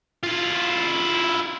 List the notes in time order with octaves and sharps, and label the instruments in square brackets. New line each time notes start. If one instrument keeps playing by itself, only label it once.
[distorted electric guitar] E4 F4